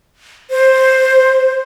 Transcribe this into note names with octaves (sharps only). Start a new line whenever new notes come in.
C5